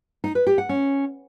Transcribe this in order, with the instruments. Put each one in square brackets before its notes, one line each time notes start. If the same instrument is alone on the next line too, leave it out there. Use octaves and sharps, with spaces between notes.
[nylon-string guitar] D#4
B4
G4
F#5
C#4